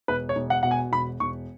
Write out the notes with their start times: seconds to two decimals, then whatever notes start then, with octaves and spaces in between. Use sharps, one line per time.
0.08 E1 B4
0.29 C#5
0.36 E1
0.50 F#5
0.63 B2 F#5
0.71 G#5
0.92 E1 B5
1.20 E1 C#6